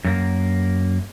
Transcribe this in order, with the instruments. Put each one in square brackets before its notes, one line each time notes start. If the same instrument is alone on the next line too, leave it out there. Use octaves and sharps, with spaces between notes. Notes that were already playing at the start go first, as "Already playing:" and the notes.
[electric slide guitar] F#2 A#3